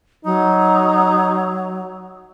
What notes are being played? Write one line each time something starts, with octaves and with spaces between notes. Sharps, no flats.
F#3 D#4